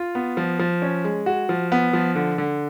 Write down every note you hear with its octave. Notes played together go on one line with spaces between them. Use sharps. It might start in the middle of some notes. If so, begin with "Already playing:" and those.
Already playing: F4
B3
F3
F3
C#4
G#3
F#4
F3
B3
F3
D3
D3